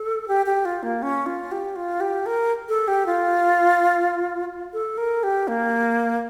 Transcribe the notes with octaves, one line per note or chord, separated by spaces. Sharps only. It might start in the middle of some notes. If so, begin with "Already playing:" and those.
Already playing: A4
G4
G4
F4
A#3
C#4
F4
G4
F4
G4
A#4
A4
G4
F4
A4
A#4
G4
A#3